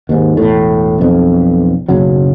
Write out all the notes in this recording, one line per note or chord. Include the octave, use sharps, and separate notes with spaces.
D#2 G#2
E1 A2
B1 F2
F#1 B1 C#3 F#3